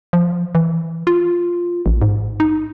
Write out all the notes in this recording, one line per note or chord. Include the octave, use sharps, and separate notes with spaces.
F3
E3
F4
A1
G#2
D#4